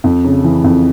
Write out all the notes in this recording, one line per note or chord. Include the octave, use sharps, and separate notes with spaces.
F2
C#3
E3
F2